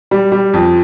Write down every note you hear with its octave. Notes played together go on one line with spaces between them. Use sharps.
G3
G3
F2